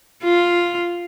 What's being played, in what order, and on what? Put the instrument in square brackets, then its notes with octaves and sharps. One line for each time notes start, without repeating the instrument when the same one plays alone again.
[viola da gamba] F4